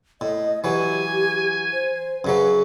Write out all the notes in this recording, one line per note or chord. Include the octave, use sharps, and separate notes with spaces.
A2 D#5
E3 F#3 G4 G#5
C5
F#2 C#3 F#3 B4